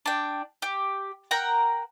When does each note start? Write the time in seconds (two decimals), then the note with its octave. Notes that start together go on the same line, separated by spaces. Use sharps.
0.06 D4 G5
0.62 G4
1.31 A#4 F#5 G5 A#5